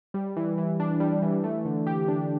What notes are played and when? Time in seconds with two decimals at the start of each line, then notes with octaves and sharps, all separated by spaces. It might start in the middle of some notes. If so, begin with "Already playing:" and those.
0.14 G3
0.37 E3
0.58 E3
0.80 D4
1.00 G3
1.22 E3
1.44 A3
1.65 D3
1.87 G4
2.08 D4